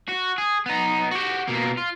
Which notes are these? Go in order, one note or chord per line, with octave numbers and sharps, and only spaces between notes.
F#4
G#4
B3 D#4
F#4 G4
B2 A#3
F4